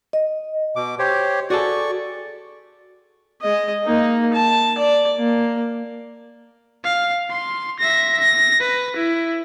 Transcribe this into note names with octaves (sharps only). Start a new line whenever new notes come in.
D#5
B2 D6
G4 C5 C#5
F#4 G#4 A4 D5 C#6
G#3 D#5
A#3 D#4
A5
D5
A#3
F5
C6
E5 A#6
A#6
B4
E4